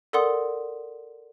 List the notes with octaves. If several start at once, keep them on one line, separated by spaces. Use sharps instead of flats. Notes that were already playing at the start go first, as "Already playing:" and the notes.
A4 A#4 D5 F#5 C6 D#6